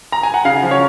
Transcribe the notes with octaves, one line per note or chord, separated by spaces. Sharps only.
A#5
G#5
F#5
C#3 F5
F3
C#5